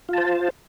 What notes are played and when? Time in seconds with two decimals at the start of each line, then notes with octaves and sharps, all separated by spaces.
0.09 F4
0.13 A5
0.18 C5